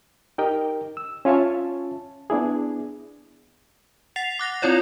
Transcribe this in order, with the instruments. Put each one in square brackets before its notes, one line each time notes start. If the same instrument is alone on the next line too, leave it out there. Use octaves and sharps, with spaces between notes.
[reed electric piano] D#4 G4 A#4 D#5 G5
E6
C#4 F4 C#5 E5 A5
B3 D4 E4 G#4
[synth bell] F#5 A6 C7 F7
D6 F#6 A#6
C4 E4 F4 C#5 D5